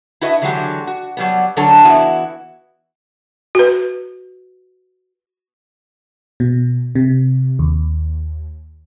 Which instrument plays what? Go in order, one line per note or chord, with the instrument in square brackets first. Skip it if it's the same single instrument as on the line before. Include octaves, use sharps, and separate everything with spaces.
[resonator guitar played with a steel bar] E4 F#4 B4 D#5 E5
D3 E3 F#3 G#3 F#4 G4
F#4
F#3 G3 B3
D3 F#3 D4 A4 A#4 C#5
E3 B3 E4 F#4
[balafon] F#4 B4
[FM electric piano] B2
C3
D#2